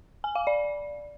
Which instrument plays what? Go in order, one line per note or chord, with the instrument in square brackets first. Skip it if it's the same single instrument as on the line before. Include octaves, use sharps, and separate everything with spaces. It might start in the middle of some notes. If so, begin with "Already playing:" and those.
[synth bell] G#5
F5
D5